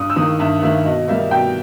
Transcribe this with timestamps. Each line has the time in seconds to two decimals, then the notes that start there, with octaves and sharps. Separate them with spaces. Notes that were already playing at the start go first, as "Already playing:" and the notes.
Already playing: G2 D#6
0.10 E6
0.16 D#3 A#3 D#6
0.39 G2 E5
0.62 D#3 A#3 E5
0.85 B2 D#5
1.08 G3 A#3 E5
1.31 B2 G5